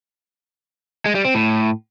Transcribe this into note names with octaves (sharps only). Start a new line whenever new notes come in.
G#3
G3
C4
A2